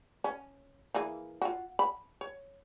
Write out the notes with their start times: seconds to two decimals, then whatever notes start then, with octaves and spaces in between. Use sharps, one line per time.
0.24 C#4
0.94 E3 A#3 G#4
1.42 F4 F#4
1.79 B5
2.21 C#5